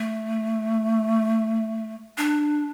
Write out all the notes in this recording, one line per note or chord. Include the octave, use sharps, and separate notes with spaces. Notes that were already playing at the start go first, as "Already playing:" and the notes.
Already playing: A3
D4